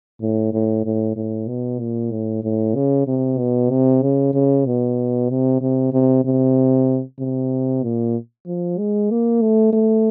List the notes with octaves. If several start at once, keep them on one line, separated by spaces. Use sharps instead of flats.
A2
A2
A2
A2
B2
A#2
A2
A2
C#3
C3
B2
C3
C#3
C#3
B2
C3
C3
C3
C3
C3
A#2
F3
G#3
A#3
A3
A3